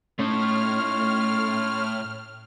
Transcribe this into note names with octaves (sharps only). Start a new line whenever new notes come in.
A2 A3 C#4 D#4 C#5 C6 F6